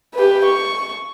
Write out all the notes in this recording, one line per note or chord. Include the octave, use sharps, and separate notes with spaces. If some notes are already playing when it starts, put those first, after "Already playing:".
G4 B4
C#6